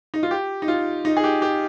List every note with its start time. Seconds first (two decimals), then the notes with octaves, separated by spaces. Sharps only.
0.14 D#4
0.23 F4
0.31 G4
0.62 D#4
0.68 F4
1.05 D#4
1.17 G#4
1.24 G4
1.42 G4